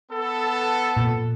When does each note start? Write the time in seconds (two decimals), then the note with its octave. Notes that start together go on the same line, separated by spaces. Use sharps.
0.11 B3 A4
0.97 A#2